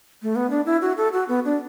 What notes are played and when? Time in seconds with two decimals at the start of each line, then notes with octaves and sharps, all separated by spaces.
0.22 A3
0.36 B3
0.50 D4
0.66 E4
0.82 F#4
0.97 A4
1.13 F#4
1.29 B3
1.45 D4